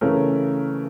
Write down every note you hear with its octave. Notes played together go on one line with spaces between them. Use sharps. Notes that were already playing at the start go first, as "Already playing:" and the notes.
C#3 E3 A3 C#4 A#4